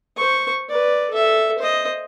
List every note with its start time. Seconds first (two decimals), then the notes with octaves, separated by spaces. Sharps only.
0.16 C5 C#6
0.69 B4 D5
1.10 A4 E5
1.58 C5 D#5